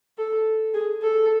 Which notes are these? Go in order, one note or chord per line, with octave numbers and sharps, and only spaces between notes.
A4
G#4
A4